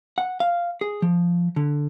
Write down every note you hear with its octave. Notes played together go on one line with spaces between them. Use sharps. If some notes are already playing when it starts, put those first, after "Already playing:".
F#5
F5
G#4
F3
D3